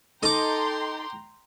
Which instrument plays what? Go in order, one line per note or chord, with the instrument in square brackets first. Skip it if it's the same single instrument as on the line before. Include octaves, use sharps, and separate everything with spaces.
[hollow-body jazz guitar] D#4 [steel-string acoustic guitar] A4 D#5 [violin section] G5 A#5 C6 [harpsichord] D6 D#6